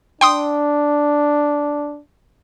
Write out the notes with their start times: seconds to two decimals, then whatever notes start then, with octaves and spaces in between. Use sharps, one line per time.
0.21 D4 G5 C6 D#6